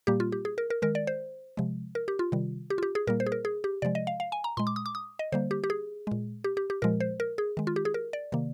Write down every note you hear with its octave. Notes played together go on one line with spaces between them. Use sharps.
A#2 G3 A#3 G4
F4
G4
G#4
A#4
A#4
D#3 G#3 A#4
D5
C5
C3 F3 G#3
A#4
G4
F4
C3 D#3 G3
G4
F4
G4
G#4
A#2 G3 A#3 A#4
C5
G#4
A#4
G#4
G4
C3 F3 G#3 D5
D#5
F5
F5
G#5
A#5
A#2 G#3 C6
D6
D#6
D6
D#6
D#5
D3 G3 A#3 C5
G4
G4
G#4
A#2 G#3
G4
G4
G4
A#2 F3 G#3 A#4
C5
A#4
G#4
D#3 G#3
F4
G4
G#4
A#4
D5
C3 D#3 A#3